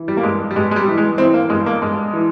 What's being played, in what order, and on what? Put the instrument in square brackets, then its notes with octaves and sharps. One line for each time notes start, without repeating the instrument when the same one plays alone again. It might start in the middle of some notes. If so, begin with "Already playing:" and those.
Already playing: [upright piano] E3
G3
A#3
G2 G#3
G3
G2 G#3
G#3
G3
E3
G#3
E3 C4
A#3
G2 G#3
A#3
G2 G#3
E3